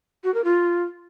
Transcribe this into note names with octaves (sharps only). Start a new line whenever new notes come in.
F#4
A#4
F4